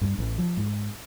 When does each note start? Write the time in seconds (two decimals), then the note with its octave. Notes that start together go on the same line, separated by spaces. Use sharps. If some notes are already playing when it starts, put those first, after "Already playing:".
0.01 G2
0.19 A1
0.38 F3
0.57 G#2